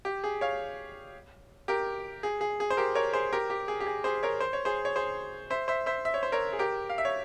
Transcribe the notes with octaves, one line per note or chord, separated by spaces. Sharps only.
G4
G#4
C#5 F5
G4 A#4
G#4
G#4
G#4
C5
G4 A#4
A#4 C#5
G#4 C5
G4 A#4
G4
G#4
G4
G#4
G#4 C5
A#4 C#5
C5
C#5
G#4 C5
C#5
G#4 C5
C5 E5
C5 E5
C5 E5
E5
C#5
C5
A#4 C#5
G#4
G4 A#4
F5
E5
C#5